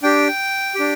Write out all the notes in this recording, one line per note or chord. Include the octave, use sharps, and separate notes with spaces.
D4 G4 G5
D4 G4